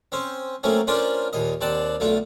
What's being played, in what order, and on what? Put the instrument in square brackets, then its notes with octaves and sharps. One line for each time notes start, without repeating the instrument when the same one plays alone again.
[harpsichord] C4 C#4 C5
F#3 A3 A#3 C4 C#4
C#4 D4 F4 A#4 C5 D5
D#2 A#2 D#5
D#2 C4 D5 F#5 A5
B1 D3 A3 F4